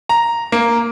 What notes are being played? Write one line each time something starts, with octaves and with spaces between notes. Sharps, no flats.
A#5
A#3